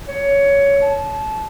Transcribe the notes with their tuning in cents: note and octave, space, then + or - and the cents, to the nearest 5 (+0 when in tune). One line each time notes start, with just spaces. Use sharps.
C#5 +15
A5 -25